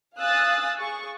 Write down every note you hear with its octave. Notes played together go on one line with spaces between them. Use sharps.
F5 G#5 D#6 E6 F#6 A6
G#4 C#6